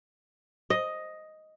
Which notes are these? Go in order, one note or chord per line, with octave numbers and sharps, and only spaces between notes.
D#5